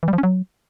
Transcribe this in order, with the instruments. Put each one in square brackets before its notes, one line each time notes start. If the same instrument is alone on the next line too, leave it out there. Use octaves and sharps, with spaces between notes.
[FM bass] E3
G3
F3
C#4
F#3